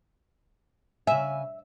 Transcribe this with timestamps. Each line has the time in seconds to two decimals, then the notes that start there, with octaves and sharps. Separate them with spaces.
1.07 C#3 E5 G#5